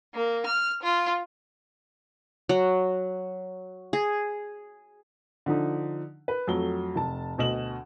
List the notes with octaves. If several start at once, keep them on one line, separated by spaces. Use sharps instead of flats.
A#3
F6
F4
F#3
G#4
D3 F3 D#4
B4
F2 F#3 A3 G7
F1 A5
D2 B2 D#5 E7 F#7